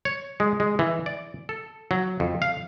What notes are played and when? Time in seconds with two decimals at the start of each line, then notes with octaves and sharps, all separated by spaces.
0.05 C#5
0.40 G#3
0.60 G#3
0.79 E3
1.06 D5
1.49 A4
1.91 F#3
2.20 F2
2.42 F5